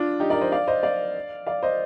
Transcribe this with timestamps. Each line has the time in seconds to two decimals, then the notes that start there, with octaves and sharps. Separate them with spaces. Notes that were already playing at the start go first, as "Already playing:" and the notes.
Already playing: D4 F4
0.20 D#4 G4
0.30 A#4 D5
0.41 C5 D#5
0.52 D5 F5
0.68 C5 D#5
0.83 D5 F5
1.47 D5 F5
1.63 C5 D#5